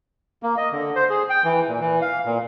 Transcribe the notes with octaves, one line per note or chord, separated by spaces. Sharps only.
A#3
D#5
D3
C5
G#4
G5
E3
A#2
E3
F5
A#2